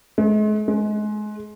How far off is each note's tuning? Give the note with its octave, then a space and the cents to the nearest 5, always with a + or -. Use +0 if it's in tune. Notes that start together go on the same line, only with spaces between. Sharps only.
G#3 +40
G#3 +25